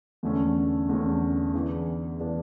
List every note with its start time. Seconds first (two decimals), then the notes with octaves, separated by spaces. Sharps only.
0.23 E2 D3 A3 C#4
0.89 E2 D3 A3 C#4
1.54 E3 B3 D4 G#4
2.20 E3 B3 D4 G#4